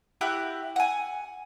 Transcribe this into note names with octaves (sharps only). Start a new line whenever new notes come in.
E4 F#4 G4 F#6
F#5 G#5